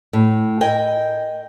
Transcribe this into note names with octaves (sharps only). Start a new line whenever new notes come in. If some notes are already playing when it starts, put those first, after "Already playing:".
A2
A#4 D#5 G5 G#5